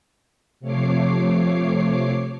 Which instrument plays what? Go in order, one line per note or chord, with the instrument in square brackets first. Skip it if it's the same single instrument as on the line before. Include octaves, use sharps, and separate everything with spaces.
[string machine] C3 F3 A3 C#5 D6 C7